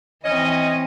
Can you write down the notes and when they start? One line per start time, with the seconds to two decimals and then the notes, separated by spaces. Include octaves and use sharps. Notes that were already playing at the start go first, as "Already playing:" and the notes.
0.24 E3 C4 C#4 D#5